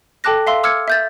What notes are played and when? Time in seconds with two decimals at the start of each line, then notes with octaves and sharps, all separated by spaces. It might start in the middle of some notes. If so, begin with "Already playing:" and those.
0.24 A4 G5 A5 D6 F#6 A#6
0.47 E5 F5 C6 E6
0.63 D6 E6 F6 G#6 C#7
0.88 E5 G6 A6